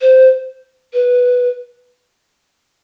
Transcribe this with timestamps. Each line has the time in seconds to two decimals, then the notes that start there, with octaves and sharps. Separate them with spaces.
0.01 C5
0.93 B4